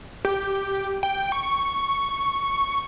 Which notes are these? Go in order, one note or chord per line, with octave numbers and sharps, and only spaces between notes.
G4
G5
C#6